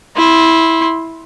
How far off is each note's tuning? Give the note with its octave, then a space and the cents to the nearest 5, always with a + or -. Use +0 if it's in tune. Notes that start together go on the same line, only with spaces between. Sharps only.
E4 -10 C6 +10